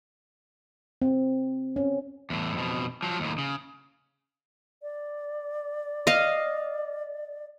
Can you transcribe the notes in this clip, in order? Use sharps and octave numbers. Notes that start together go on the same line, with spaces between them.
C4
C#4
E2 A2
F2 B2
F3 F#3
D#2 A2
C#3
D5
D#5 F5